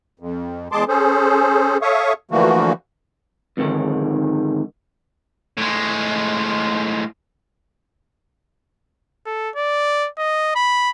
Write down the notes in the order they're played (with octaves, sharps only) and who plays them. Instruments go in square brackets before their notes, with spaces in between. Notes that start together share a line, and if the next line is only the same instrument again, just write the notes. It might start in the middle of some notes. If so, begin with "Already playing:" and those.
[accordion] F2
E2 G#3 G#4 A5 C6 D6
C#4 G#4 A4 C5
A4 C#5 E5 F5 C#6 D#6
D3 E3 F3 A3 A#3 F#4
[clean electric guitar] F2 G#2 D3 D#3
[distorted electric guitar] A2 G#3
[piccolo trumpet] A4
D5
D#5
B5